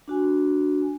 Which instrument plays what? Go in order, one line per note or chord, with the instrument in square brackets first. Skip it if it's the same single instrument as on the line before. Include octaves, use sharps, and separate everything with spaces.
[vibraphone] D4 F#4 G#5